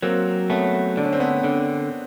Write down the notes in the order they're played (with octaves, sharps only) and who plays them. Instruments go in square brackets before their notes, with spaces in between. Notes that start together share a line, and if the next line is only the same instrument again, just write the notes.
[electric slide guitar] F#3 [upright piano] A#3 C4
[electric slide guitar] A3 [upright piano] B3 C#4
[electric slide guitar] D3 [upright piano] D4
[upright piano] C#4
C4
B3 C#4
[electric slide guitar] D3